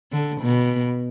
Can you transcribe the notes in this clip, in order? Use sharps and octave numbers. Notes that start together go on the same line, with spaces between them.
D3
B2